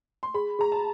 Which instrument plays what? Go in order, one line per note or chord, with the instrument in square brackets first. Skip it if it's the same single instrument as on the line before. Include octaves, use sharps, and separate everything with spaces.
[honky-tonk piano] C6
[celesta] G#4 [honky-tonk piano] B5
[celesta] G#4 [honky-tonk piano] A#5
[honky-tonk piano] A5